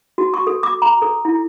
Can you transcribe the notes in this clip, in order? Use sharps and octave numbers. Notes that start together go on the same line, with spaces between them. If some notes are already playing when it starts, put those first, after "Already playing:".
F#4
C#6
A4
D6
A#5
A4
E4